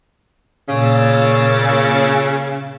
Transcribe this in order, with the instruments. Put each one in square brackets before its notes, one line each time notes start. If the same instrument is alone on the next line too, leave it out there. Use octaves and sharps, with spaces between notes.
[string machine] A#2 E6 A6 [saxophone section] C#3